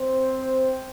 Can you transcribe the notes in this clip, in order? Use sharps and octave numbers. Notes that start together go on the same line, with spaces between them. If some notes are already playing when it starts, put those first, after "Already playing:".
Already playing: C4 C5